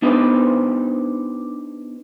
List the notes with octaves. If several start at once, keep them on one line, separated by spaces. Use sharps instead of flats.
B3 D4 D#4 G4 B4 C5